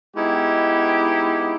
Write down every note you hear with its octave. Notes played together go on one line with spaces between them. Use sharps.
G#3 B3 D#4 E4 G4